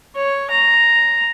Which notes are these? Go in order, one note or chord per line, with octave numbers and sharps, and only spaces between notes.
C#5
A#5